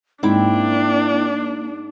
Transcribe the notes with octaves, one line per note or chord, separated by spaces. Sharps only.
G#2 A#3 C4 D4 E4 G5